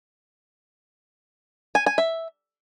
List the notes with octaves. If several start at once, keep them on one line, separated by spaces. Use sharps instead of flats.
G#5
G#5
E5